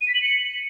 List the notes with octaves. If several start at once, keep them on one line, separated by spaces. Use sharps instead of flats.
D#7
B6
F#7
C#7